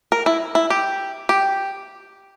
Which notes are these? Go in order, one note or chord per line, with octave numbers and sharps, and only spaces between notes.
A#4
E4
E4
G4
G4